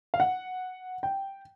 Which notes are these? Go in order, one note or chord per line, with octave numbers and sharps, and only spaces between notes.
F5
F#5
G5